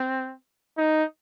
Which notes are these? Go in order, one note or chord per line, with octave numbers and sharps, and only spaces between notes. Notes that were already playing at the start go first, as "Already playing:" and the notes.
Already playing: C4
D#4